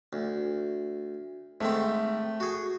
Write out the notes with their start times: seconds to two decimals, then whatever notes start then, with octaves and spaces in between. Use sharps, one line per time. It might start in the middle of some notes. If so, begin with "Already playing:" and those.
0.13 D2
1.61 G#2 D#3 A3 C4
2.40 F#4 G#4